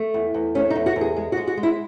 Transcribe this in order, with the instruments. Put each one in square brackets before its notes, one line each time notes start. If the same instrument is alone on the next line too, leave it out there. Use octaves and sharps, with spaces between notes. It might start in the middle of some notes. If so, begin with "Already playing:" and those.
Already playing: [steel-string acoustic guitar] A3
E2
E2
A3 C#4
D#4
E2
F#4
E2
G#4
G#3
F#4
G#3
F#4
G#3
E4